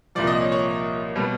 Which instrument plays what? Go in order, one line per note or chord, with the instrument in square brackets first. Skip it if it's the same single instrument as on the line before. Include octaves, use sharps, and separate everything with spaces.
[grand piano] C2 A#2 F3 D5
D#5
C#5
C#5
B2 G3 B3